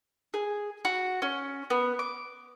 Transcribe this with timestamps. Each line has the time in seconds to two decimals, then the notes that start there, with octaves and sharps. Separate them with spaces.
0.34 G#4
0.85 F#4
1.22 C#4
1.70 B3
1.99 D6